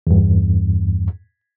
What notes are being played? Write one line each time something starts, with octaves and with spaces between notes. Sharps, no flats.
E2 G2